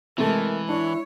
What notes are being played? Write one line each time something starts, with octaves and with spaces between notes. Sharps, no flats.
C3 E3 G#3 A3 A#4
D4 E4 C#5